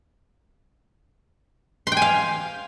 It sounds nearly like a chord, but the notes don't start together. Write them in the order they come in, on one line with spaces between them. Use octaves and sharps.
C6 G5 G#5 F5